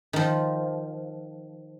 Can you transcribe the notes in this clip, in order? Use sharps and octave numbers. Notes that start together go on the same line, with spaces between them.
D#3 F3